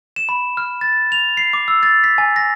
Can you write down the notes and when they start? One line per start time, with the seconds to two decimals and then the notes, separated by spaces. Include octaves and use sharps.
0.16 E7
0.29 B5
0.57 F6
0.81 A6
1.12 F7
1.37 C7
1.53 D6
1.68 E6
1.83 A6
2.04 B6
2.18 G#5
2.36 A#6